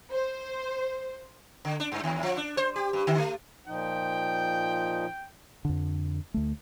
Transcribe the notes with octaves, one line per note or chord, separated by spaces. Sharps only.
C5
D3
D4
G2
D#2
F3
D4
C5
G4
G2
D3
A3
A#2 F3 D#4 G5
F2 D3
D2 A3